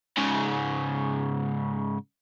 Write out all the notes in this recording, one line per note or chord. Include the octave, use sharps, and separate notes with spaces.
G#2 C#3